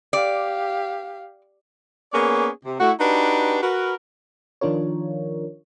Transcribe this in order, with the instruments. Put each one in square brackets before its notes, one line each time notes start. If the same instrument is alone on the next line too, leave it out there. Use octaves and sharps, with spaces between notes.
[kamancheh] G4 F5 [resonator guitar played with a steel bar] D5
[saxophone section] A#3 B3 C#4 G#4 C#5 D5
C3
A3 E4 F#4
D4 D#4 F#4 G4 B4
F#4 A#4 B4
[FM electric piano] D#3 F3 D4 F4 A#4 C#5